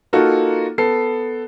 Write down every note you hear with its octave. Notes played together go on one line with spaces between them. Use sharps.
A#3 D#4 F4 F#4 A4
B3 A4 C7